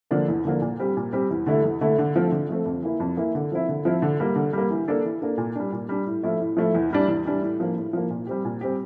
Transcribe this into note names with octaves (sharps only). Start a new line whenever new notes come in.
D3 F3 A#3 D4
E2
D3 F3 A#3 D4
A#2
G3 C4 G4
A#2
G3 C4 G4
E2
D3 A3 E4
E2
D3 A3 E4
D3
F3 A3 C4
D3
F3 A3 C4
F2
E3 A#3 E4
F2
E3 A#3 E4
D3
F3 C4 E4
D3
F3 C4 E4
D3
G3 A#3
D3
G3 A#3
E3
A#3 D4 A4
E3
A#3 D4 A4
A#2
G3 D4
A#2
G3 D4
A2
F3 A3 E4
A2
F3 A3 E4
E2
E3 G3 D4
E2
E3 G3 D4
A2
F3 A#3
A2
F3 A#3
A#2
G3 C4 G4
A#2
G3 C4 G4